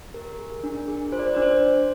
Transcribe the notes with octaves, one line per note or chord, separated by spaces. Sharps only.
G4 A#4
G#4
D4
G#4
F4 C5
D5
C5
D4 D5
C5